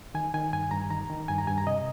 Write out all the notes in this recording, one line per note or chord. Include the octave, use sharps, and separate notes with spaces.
D#3 G#5
D#3 G#5
G2 G#5
G2 A#5
D#3 A#5
D#3
G2 G#5
A#5
G2 G#5
A#5
C3 D#5